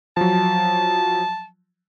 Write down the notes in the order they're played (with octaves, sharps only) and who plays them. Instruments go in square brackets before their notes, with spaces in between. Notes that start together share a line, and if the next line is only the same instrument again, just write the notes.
[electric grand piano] F3 F#3 [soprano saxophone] A5